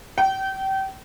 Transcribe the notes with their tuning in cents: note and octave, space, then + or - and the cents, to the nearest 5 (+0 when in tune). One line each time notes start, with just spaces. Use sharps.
G5 -30